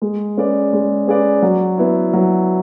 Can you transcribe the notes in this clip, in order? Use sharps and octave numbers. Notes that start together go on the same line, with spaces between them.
G#3
C#4 G#4 B4 D5
G#3
C#4 G#4 B4 D5
F#3
B3 E4
F#3